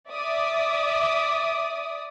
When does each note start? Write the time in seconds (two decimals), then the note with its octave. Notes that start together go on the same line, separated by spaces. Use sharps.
0.11 D5 E5 D6 D#6